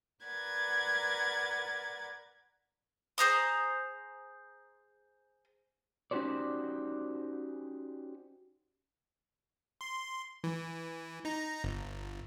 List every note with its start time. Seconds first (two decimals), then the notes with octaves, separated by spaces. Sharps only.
0.23 A#4 B4 D5 F#5 G#6 A6
3.18 G#4 C5 A#5 D#6
6.11 C#4 D#4 F#4 G4 C5 D5
9.81 C6
10.44 E3
11.25 D#4 A#5
11.64 G1